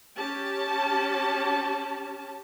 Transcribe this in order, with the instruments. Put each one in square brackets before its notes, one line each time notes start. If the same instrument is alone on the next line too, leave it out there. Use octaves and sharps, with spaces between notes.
[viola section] C#4 G4 A5